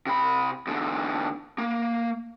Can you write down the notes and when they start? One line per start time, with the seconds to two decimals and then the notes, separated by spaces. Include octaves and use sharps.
0.06 C3 B5
0.67 E2 D3
1.58 A#3